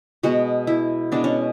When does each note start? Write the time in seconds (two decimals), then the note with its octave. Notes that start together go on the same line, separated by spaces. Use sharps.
0.23 B2 G#3 B3 F#4
0.67 E4
1.12 B2 G#3 B3 D4
1.24 C#4